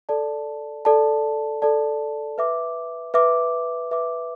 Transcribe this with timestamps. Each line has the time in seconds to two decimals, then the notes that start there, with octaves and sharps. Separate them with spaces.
0.09 A4 D5 A5
0.85 A4 D5 A5
1.62 A4 D5 A5
2.38 B4 E5 D6
3.14 B4 E5 D6
3.91 B4 E5 D6